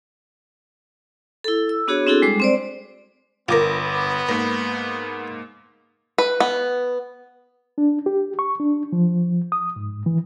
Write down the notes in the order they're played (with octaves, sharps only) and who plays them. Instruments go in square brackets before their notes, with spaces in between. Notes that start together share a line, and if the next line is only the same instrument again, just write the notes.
[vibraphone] E4 A4
E6
B3 D4 F#4 G#4 C#5
C4 D4 E4 F#4 G#4 A4
G3 G#3 D6
C4 C5 D5
[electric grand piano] G1 D6 A#6 [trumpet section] B3 [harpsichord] F4 A#4
[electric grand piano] G#2 A#3 A#6 [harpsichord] B4
[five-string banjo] B4
B3
[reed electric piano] D4
G4
C#6
D4
F3
D#6
G#2
E3